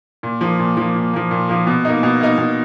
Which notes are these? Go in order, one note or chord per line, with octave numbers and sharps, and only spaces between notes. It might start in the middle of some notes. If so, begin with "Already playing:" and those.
A#2
F3 A#3
A#2
F3 A#3
A#2
F3 A#3
A#2
F3 A#3
B2
A#3 D#4
B2
A#3 D#4
B2